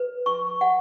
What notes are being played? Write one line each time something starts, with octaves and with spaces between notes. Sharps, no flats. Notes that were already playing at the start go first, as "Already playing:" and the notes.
Already playing: B4
C#6
F#5